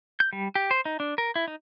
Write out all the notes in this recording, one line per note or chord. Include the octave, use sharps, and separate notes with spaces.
G6
G3
G4
C5
D#4
D4
A#4
E4
D#4